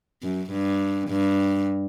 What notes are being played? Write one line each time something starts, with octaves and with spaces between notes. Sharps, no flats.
F#2
G2
G2